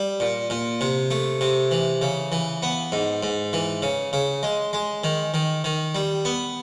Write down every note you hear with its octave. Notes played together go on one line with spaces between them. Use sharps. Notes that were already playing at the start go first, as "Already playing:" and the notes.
Already playing: G3
A#2
A#2
C3
A3
C3
E3
C#3
E3
B3
G#2
G#2
E3
C#3
C#3
G#3
G#3
D#3
D#3
D#3
G3
B3